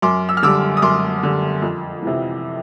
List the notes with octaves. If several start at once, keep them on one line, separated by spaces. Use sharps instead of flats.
F#2 C6 D6
E6
F6
D3 G3 D6 E6
D#6
F#2 C6 D6
D3 G3
F2
C3 E3